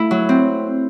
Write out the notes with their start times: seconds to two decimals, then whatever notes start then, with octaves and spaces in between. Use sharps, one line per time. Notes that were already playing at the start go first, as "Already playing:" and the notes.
Already playing: A3 E4
0.11 F#3
0.29 C4